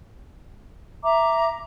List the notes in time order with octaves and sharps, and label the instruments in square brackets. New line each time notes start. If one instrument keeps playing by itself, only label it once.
[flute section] E5 A#5 D6